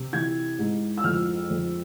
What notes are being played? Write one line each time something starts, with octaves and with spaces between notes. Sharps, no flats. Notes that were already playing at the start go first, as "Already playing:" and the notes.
Already playing: C3
E3 G#6
G#2
E6
F2 F6
F2